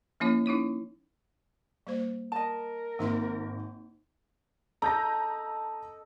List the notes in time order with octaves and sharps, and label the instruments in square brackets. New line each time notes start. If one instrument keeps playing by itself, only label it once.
[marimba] F3 A#3 C#4 E4 C#5
C#4 D#4 E4 C#5
[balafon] G3 A#3 C5
[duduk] A#4 [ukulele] D#5 A5
[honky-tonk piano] G#1 [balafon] A#3 E5 C6
[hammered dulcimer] A4 D#5 [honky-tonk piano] A#5 G6 A#6